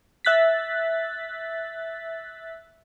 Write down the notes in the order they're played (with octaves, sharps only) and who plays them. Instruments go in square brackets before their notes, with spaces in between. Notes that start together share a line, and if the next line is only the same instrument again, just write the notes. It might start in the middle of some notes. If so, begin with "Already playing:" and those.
[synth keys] E5 F#6 A6 B6